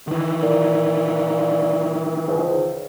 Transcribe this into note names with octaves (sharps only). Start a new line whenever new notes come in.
D#3 E3
A#2
C#2 G#2